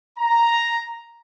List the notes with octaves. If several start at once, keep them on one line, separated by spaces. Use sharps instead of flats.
A#5